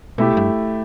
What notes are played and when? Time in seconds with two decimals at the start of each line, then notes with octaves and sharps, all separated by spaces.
0.18 B2 A3 E4 G4
0.37 G2